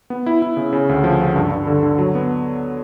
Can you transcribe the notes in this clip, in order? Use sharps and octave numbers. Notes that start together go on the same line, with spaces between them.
B3
E4
E4
C#3
C#3
D2
F3
C#3
G2
G2
D3
D3
F#3
B3